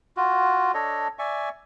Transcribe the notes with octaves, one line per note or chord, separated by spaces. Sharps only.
F4 F#4
D4 A4 C#5 D#5
D5 E5 G#5 C#6